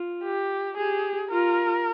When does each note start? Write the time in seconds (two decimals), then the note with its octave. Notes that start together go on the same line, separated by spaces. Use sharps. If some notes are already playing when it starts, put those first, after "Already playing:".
Already playing: F4
0.24 G4
0.77 G4 G#4
1.31 F4 A#4